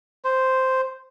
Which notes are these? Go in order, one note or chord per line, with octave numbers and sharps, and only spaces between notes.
C5